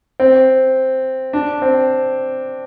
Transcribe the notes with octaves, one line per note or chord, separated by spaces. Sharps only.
C4
D4
C4